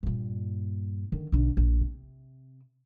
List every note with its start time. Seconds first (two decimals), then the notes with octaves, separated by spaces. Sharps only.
0.03 G2 A#2
1.12 D3 D#3
1.32 B1 D3
1.57 A#1
1.81 C3